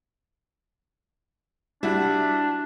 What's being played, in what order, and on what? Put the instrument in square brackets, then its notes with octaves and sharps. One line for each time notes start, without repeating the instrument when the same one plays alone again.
[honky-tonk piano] G3 E4 F#4 [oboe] D4